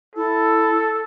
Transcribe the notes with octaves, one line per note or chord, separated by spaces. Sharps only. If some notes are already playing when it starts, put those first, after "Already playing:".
E4 A4